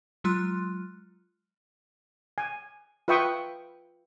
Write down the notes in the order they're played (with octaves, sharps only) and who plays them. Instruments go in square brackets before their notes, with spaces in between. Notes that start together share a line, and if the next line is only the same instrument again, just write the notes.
[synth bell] F#3 G#3 F4 C6 F6 F#6
[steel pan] G#5
F4 B4 E5 G5 C#6 D#6